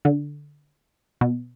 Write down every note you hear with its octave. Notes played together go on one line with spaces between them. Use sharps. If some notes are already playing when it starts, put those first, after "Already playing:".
D3
B2